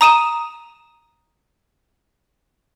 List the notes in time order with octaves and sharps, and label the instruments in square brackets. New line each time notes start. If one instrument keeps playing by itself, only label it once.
[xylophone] A#5 D#6 D#7 E7